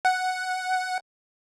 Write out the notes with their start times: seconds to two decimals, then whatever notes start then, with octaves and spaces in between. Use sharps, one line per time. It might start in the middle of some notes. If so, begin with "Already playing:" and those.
0.05 F#5